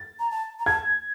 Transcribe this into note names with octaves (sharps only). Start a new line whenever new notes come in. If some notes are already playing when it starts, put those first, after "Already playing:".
Already playing: A6
A#5
A5
A#5
A5 G#6